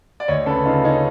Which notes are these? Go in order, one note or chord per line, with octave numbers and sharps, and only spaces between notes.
D5
D2 C#5 D#5
C#3 A4 B4
C#3 D#4 F4
C#3 C#4 D#4